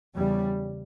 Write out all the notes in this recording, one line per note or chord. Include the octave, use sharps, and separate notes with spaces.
E2 G3
C#3